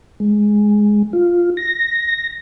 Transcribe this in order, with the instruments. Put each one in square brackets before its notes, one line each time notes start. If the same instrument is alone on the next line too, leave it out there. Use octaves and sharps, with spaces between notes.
[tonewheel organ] G#3
F4
A#6